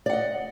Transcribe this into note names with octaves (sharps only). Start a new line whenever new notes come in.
D5 D#5 F#5